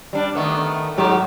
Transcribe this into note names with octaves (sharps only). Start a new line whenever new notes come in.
G3 D4
D#3 A3 B3
G#2 F#3 G4